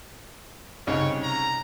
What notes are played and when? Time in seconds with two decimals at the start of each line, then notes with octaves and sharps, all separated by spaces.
0.87 C2 C#3 D#4 C#5
1.23 A#5